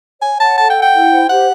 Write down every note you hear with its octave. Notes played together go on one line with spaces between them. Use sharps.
C#5 G#5
F#5 A5
A4 A5
G5
F#5
G5
E4
C5
G4 F#5